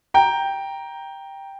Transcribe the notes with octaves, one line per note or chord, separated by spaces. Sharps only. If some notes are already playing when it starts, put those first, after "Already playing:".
G5 A#5